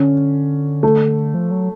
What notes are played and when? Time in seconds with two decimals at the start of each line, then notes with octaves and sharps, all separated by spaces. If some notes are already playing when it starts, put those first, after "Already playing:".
Already playing: D3 C#4
0.83 A3
1.34 F3
1.51 F#3